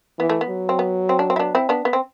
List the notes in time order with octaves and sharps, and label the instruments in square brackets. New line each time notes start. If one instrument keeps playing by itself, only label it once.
[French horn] E3 [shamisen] B3
[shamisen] A3
B3
[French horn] F#3
[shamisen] C4
B3
C4
D4
C4
E4
B3 D4
C4 E4
B3 D4
B3
C4